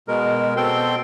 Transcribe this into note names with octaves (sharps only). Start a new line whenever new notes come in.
B2 G#3 A#4
B2 C4 A4 G5 C6